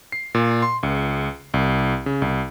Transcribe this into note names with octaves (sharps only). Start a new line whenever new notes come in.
C7
A#2
C6
C#2
C2
C#3
C2